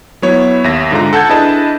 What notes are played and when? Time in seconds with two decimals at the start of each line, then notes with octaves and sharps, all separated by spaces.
0.22 F#3 B3 E4 C#5
0.64 D#2 E5 A#6
0.91 G#2 D3 F4 A#5
1.13 A4 F#5 A5 G6 G#6
1.29 D4 E4 G#4 B4 D#5 A5